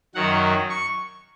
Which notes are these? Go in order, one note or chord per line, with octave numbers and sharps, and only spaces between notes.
F#2 D#3 F#3 F#5
C#6